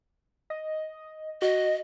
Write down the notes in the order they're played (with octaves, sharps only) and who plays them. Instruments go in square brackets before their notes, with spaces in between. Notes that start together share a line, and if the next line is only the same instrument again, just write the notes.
[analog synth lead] D#5
[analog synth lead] F#4 [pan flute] D#5